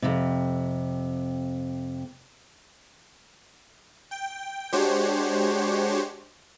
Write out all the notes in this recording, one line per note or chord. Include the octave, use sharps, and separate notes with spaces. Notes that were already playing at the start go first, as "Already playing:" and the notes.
F2 C3
G5
G#3 D4 F#4 G4 C5 C#5